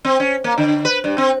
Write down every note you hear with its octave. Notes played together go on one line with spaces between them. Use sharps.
C4
C#4
A#3
D3
B4
G2
C4